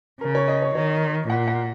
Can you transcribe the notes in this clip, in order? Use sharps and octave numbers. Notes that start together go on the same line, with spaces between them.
C#3 A#4
C#5
D#5
C#5
D#3 C#5
A#2 F#5
F#5